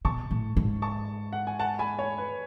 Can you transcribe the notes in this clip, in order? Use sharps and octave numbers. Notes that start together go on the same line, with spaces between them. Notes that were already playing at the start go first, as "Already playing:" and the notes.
B2 A5 C#6
A2
G#2
A5 C#6
F#5
G#5
F#5 A5
G#5 B5
C#5
B4